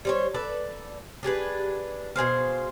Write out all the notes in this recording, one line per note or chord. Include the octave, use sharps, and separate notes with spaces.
G3 C5 C#5
A4 B4 D5
D4 G4 G#4 B4
B2 G#4 C5 F5